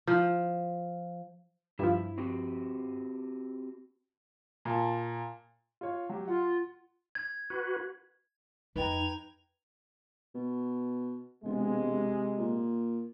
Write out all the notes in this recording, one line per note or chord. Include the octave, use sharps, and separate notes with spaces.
F3
G2 F3 E4
C4 F#4 G4
A#2 A5
F4 C#5
F#3 G4
F4 F#5
G#6
F#4 B4
F2 D#4 B4 G5 A#5 G#6 F7
B2
E1 C3 G#3
A#2